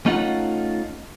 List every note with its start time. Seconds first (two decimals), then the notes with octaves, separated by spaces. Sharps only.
0.06 A3 C#4 D#4 F4 F#5